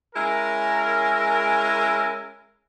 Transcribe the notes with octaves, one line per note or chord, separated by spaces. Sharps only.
G#3 C#4 E4 A#4